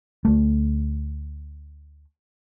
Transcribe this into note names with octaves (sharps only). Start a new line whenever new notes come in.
D2 A3